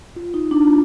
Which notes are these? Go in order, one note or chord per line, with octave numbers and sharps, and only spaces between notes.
F4
D#4
D4
F4